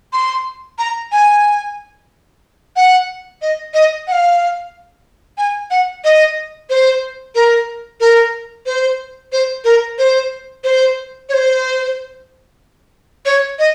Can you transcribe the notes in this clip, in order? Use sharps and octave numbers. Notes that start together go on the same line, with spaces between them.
C6
A#5
G#5
F#5
D#5
D#5
F#5
F5
G#5
F#5
D#5
C5
A#4
A#4
C5
C5
A#4
C5
C5
C#5
C5
C#5
D#5